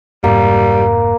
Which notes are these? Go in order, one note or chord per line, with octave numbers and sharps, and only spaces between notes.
F1 G#2 G3 A#3